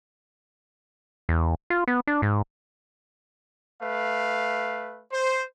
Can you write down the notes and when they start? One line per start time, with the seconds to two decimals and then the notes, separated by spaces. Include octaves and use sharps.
1.29 E2
1.70 F4
1.88 B3
2.07 D4
2.22 G#2
3.82 A3 B4 F5
5.12 C5